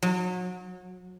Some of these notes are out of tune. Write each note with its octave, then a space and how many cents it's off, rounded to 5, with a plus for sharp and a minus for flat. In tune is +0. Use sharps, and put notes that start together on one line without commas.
F#3 -30